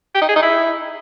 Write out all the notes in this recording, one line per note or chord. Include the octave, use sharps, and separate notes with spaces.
G4
D#4
G#4
D#4
E4